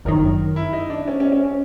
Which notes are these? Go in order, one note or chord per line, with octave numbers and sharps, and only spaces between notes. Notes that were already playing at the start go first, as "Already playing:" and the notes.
G1 F#2 D#3 A#4
E4
D#4
D4
C#4
C#4
C#4
C#4